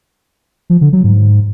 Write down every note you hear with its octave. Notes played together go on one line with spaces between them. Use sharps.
F3
D3
F#3
G#2